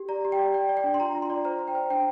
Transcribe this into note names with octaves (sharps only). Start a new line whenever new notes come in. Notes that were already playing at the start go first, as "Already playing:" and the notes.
Already playing: G4
D5 A#5
G4
G5
D5
D5 G5
D5
G5
D4
C6
F4 A#5
F4
C6
D5
C5 A#5
C5
G5
C5
D4 G5